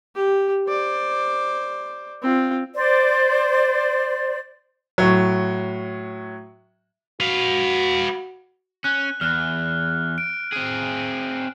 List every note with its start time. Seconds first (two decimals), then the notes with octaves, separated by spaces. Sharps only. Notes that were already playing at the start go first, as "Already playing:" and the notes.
0.15 G4
0.68 C5 D5
2.22 C4 F4
2.73 C5 D5
4.98 A2 F#3
7.20 F#4 B4 F5
8.84 C#4 F#6
9.21 E2 F6 F#6
10.18 D7
10.53 C4 G#4